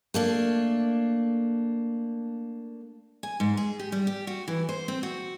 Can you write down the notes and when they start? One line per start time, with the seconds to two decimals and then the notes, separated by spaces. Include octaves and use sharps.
0.14 A3 A#3 D4
3.23 G#5
3.40 G#2
3.57 G#4
3.79 G4
3.92 G3
4.07 G4
4.27 F#4
4.48 E3
4.69 C5
4.88 C4
5.03 F#4